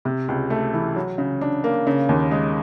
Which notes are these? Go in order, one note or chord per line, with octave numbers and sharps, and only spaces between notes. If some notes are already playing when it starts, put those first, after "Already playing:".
C3
C#2
A3
E3
F#3
C#3
D4
A#3
C#3
D#2
G#3